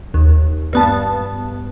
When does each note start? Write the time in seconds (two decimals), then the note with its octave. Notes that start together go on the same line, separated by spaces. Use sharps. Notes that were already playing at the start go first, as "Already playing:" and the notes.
0.14 D#2
0.73 G2 B3 A5